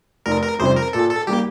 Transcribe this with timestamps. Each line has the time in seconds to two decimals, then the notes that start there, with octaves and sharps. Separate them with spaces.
0.26 F1 A#4
0.43 A#4
0.59 F2 C3 G3 C4 C5
0.76 A#4
0.93 A#2 A4
1.10 A4
1.27 G3 A#3 G4